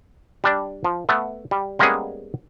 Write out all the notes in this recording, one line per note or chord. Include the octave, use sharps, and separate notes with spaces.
G3 D4 D5
F3
A3 B3
G3
G3 G#3 A#3 B3 C#4 G#4